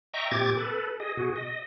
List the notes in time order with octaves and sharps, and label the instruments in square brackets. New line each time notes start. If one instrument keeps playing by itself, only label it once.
[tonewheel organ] D#5 E5 G5 A#5 C#6
A#2 C4 G4 D6 G#6 A6
A4 B4
G#4 D#5
B2 F#4 G#4
D#5